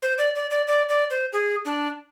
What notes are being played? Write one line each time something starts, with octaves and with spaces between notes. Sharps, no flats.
C5
D5
D5
D5
D5
D5
C5
G#4
D4